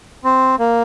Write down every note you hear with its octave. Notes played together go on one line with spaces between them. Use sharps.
C4
A#3